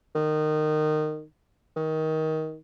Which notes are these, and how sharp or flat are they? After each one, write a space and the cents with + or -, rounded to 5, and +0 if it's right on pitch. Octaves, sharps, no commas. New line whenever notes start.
D#3 -20
D#3 +20